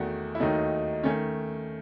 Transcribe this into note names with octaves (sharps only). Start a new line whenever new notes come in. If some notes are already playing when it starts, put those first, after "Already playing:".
Already playing: E2 D#3 A3 F#4
E4
D#2 D#3 F#3 A3 D#4
D#3 A3 C#4